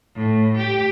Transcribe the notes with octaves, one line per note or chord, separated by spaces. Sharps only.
A2
G4